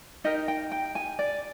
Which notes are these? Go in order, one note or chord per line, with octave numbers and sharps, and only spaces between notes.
D#4 G4 A#4 D#5
G5
G5
G#5
D5